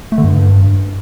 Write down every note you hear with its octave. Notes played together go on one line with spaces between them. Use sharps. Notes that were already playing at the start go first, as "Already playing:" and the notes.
A3
D3
G2